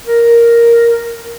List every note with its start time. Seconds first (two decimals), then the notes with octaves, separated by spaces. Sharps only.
0.07 A#4